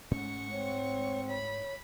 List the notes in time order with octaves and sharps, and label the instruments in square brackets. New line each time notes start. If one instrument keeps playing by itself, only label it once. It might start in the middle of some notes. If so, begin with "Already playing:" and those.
[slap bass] G#2 G#3 A3 [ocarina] C#4 [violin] F#5 C#6
[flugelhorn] C4 [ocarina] C#5
[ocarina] C#5 [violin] B5